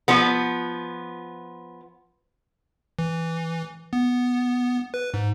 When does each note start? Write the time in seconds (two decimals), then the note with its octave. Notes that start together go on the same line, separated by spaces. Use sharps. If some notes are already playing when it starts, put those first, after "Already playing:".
0.08 F3 B3
2.99 E3
3.93 B3
4.94 B4
5.14 G#2